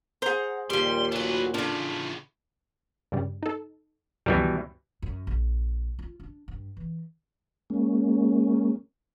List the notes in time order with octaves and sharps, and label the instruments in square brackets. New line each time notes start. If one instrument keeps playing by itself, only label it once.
[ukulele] G#4 C5 [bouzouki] F#5 A#5
[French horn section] D#2 A#2 [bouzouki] F3 G3 [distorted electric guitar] C6
[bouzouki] F#3 F#4 [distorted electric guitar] A3 B4
[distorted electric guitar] A2 C#3 [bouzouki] A3 F4 [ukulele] D4
[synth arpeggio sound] G2 C#3 G3
D#4 A4
[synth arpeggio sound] C#2 F#2 D#3 [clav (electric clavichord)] B2 E3 G3
[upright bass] F#2
A#1
F4
D4
G2
E3
[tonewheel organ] G#3 A#3 C#4